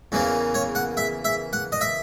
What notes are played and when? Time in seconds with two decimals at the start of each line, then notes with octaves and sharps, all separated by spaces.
0.12 E2 C#3 E3 A#3
0.54 C#5
0.75 F#5
0.97 E5
1.25 E5
1.53 F#5
1.72 D#5
1.81 E5